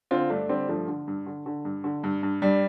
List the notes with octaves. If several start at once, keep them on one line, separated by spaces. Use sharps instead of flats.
D3 C4 F4
G2 A3 D4
D3 G3 C4
G2 F3 A3
D3
G2
D3
D3
G2
D3
G2
G2
G2 G3